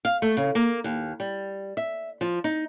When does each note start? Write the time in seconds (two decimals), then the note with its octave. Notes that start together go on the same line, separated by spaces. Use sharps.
0.05 F5
0.22 A3
0.37 C#3
0.55 A#3
0.84 D#2
1.20 G3
1.77 E5
2.21 F3
2.44 D#4